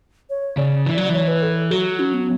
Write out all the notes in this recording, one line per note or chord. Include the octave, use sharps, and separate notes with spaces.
C#5
C#3 D5
E3
F#3
E3 D5
C#5
B4
A4
F#3 F#4
C#4
B3